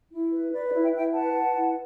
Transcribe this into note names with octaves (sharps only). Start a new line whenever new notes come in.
E4
B4
B4 D5
D5
E4
E5 G5
E4
E5 G5
B4 F#5 A5
B4
E4